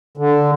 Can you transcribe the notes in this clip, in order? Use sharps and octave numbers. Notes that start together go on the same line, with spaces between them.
D3